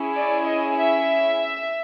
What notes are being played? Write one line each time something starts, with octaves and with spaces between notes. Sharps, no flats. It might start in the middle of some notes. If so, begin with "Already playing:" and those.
Already playing: C#4 E4 G#4
D5
D#5
E5